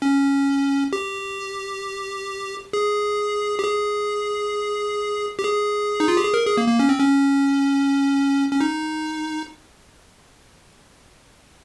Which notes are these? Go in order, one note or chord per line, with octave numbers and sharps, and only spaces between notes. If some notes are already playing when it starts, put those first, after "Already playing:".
C#4
G4
G#4
G4
G#4
G4
G#4
D#4
F4
G4
G#4
A#4
G#4
A#3
A#3
C#4
C4
C#4
C#4
D#4